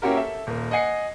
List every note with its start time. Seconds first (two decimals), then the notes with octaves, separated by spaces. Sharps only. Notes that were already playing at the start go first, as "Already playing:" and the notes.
0.02 A#3 C#4 E4 F#4 G4 A#4
0.16 A4 E5
0.47 D#1 A#3
0.71 D#5 F#5 G#5 C7 C#7